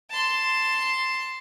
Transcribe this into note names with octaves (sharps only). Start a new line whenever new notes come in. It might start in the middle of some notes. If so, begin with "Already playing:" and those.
A5 C6